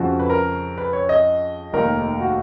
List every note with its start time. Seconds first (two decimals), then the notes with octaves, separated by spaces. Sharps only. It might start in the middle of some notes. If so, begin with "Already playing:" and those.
Already playing: F2 C#3 F3 F#4
0.19 B4
0.30 A#4
0.78 B4
0.93 C#5
1.09 D#5
1.73 F1 D#2 D#3 A#4
2.20 F#4